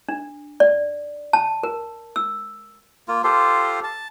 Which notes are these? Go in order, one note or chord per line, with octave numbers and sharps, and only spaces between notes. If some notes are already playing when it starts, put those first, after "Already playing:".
D4
D5
A5
A#4
E6
A#3 F4
F4 G4 A4 C5
A5